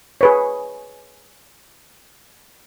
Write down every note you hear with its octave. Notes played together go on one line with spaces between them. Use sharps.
G#4 B4 C#5